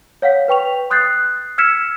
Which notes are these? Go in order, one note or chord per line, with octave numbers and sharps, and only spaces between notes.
C#5 F5 F#5 B6
B4 G5 C#6 F7
C6 D#6 F#6 G6 A6 C7
E6 F6 G#6 B6 C#7 E7